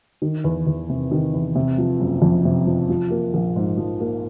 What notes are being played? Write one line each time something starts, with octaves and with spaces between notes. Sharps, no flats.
D#3
E2
E2
C3
D#3
E2
C3
F3
F#1
F2
C3
F3
F3
A#3
A#1
G#2
F3
A#3